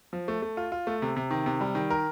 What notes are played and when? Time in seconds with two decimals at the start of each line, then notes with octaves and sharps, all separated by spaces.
0.13 F3
0.28 A3
0.42 A3
0.57 F4
0.72 F4
0.87 A3
1.02 C3
1.16 C3
1.31 D#3
1.46 C3
1.61 G3
1.75 D#3
1.90 A#4